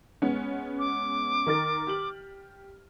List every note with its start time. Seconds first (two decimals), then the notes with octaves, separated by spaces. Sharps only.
0.22 G#3 B3 C#4
0.79 D6
1.46 D#3 A#4 A6
1.87 G4 F6 F#7